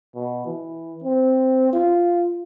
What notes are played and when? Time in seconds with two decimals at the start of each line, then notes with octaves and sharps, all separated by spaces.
0.15 B2
0.46 E3
1.03 C4
1.73 F4